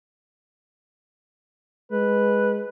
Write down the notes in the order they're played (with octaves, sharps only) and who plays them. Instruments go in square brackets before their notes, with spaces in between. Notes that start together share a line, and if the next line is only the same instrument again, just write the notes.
[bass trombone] G#3 [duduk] B4